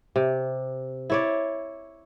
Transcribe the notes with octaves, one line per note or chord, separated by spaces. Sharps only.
C3
E4 C#5 D5